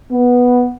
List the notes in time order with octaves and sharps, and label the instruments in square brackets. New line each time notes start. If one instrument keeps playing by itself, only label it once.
[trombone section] B3